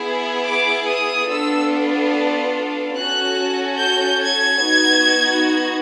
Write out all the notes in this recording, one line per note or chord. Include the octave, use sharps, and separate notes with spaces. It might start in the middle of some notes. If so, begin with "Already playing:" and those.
Already playing: B3 E4 G#4
D6
D#6
B3 D4 F4 A4 E6
C#4 F#4 A4 F#6
G6
G#6
B3 D#4 F#4